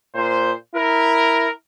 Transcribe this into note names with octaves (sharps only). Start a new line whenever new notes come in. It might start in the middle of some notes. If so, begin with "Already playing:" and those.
A#2 C5
E4 A#4